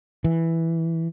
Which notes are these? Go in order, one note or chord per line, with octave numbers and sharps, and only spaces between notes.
E3